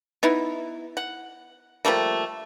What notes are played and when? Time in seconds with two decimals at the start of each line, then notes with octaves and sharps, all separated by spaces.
0.23 B3 D#4 E4
0.97 F#5
1.85 F3 G3 A3 A#3